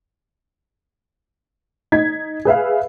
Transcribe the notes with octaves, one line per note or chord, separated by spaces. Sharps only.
D#4 G#6 B6
G#4 B4 E5 F5